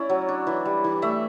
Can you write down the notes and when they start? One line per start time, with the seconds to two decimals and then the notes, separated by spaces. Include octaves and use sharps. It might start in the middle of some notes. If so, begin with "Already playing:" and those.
Already playing: C#4 E4 D5
0.09 F#3
0.29 D4
0.47 E3
0.65 G3
0.84 E3
1.02 A3 E5